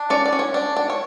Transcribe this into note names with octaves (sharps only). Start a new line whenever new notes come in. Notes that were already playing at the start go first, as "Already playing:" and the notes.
Already playing: D4
C#4 D5
D5
C#4
C#5
D4
D4
C#5